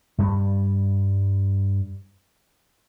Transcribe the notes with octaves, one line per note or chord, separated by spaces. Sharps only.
G2 G3